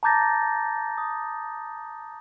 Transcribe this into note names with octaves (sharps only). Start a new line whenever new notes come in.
A5 A#5 D6 G6 A6 A#6
D#6